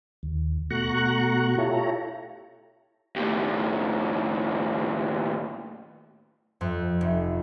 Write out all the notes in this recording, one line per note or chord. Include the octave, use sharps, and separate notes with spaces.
D#2
B2 A3 F#4 A#5 C#6 F#6
E4 F4 G4 A4 C#5 A#5
D#2 A2
F2
F1